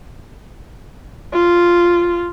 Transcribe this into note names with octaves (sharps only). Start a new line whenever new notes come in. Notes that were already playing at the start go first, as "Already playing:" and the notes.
F4